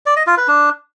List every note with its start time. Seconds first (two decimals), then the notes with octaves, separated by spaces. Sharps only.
0.06 D5
0.16 D#5
0.27 F4
0.37 B4
0.48 D4